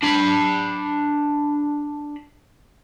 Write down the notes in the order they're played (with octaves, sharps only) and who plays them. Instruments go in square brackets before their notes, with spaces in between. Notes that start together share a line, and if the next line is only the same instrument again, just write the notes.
[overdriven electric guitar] D4 B5